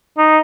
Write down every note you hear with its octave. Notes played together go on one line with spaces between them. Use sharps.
D#4